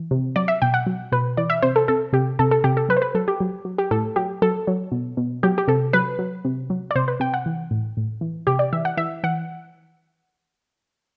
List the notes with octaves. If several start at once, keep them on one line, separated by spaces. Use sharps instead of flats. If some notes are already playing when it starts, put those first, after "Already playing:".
Already playing: E3
C3
F#3 D5
E5
B2 G5
F#5
F#3
B2 B4
E3 D5
E5
C3 C5
A4
C3 A4
C3 G4
C3 A4
A4
C3 G4
A4
F#3 B4
C5
B4
F#3 A4
G4
F#3
F#3
G4
A2 A4
F#3 G4
F#3 A4
F#3
B2
B2
F#3 G4
G4
C3 A4
F#3 B4
F#3
C3
F#3
D5
C3 C5
B4
C3 G5
F#5
E3
A2
A2
E3
C3 G4
D5
E3 E5
F#5
E3 E5
E3 F#5